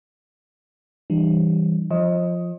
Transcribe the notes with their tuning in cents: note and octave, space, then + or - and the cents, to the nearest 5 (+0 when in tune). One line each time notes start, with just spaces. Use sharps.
E3 +0 G3 +0 D4 +45
F3 +0 C5 +40 D#5 +10